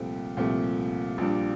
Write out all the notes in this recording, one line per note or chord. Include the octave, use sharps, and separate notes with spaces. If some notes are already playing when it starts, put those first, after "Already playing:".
Already playing: C2 A#2 F3 A3 C4 G5
C2 A#2 F3 A3 C4
A#1 A#2 G3 D4